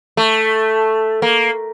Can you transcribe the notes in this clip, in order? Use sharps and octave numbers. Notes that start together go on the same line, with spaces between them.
A3
A#3